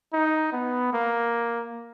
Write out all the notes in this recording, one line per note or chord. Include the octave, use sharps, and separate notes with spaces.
D#4
B3
A#3